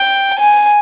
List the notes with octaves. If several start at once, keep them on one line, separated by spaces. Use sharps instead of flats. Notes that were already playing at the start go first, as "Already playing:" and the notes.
Already playing: G5
G#5